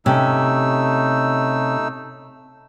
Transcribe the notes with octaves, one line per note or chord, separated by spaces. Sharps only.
C3 A3 C#4 D#4 E6